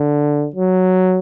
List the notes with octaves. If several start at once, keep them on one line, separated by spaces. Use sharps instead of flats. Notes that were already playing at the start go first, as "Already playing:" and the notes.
Already playing: D3
F#3